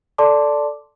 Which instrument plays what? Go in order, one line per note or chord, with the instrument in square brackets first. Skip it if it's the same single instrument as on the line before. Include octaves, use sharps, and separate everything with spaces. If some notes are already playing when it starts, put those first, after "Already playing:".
[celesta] A4 D5 A5 C6 D6